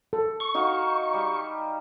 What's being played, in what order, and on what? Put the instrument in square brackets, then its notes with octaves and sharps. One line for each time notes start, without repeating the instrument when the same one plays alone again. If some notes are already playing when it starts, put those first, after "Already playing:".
[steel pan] A4
[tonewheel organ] C#6
[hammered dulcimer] D#4 F#4 F5
G3